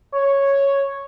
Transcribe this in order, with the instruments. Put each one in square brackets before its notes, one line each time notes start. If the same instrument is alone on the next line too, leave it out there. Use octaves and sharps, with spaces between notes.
[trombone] C#5